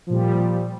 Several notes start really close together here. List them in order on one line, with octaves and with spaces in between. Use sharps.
F3 A#2 G3